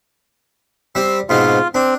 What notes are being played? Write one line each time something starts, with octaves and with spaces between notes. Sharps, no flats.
G3 C4 E6
G#2 B2 C4 F4
C4 D4